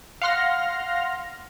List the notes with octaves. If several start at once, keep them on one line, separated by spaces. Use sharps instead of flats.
F5 F#5 C6 F6 A#6